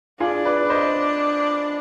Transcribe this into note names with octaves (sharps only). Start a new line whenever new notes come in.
D4 F4 G#4
B4 D5
C5 D#5